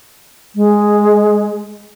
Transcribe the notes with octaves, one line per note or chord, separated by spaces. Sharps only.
G#3